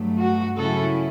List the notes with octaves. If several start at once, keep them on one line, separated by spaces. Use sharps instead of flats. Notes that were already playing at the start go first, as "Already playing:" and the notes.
Already playing: G2 F#3 A3
F#4
C#3 F#3 C#4 E4 F#4 A4